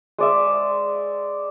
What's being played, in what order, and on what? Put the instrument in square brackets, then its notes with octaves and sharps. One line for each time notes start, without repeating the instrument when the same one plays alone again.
[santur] G#3 D5 E5